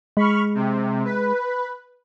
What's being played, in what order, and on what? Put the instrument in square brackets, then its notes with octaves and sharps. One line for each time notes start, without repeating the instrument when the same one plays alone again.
[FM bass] G#3 [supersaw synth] B5 C#6 F6
[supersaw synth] C3
B4